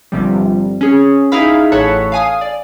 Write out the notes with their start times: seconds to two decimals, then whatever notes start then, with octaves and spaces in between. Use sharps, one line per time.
0.12 G1 C3 F3 G3
0.81 C#4 G#4
1.32 D#4 E4 G#4 F5 B5
1.72 A1 A4 C#5 F#5 B5
2.12 F5 G#5 D#6
2.41 D5